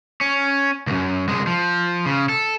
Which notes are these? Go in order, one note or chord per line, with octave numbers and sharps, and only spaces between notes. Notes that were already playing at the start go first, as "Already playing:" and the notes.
C#4
C#2 F#2
C2 G#3
F3
C#3
A4